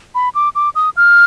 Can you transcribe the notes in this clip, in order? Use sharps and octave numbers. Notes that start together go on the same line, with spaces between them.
B5
D6
D6
D#6
F6